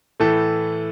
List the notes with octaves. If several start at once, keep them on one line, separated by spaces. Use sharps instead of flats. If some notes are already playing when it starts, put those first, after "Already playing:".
A2 E3 A3 A4